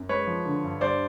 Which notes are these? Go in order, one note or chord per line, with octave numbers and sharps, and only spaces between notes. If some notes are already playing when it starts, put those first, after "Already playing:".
Already playing: F#2
G#3 B4 C#5
F3
D3
G2
G3 C5 D5